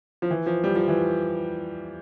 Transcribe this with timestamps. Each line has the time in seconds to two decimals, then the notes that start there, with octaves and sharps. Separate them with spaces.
0.22 F3
0.31 E3
0.46 F3
0.64 G3
0.75 F3
0.88 E3